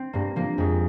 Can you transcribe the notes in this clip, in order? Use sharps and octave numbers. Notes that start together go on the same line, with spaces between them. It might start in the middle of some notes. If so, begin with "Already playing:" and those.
Already playing: C4
G2 A#3
F3 A#3
F2 G#3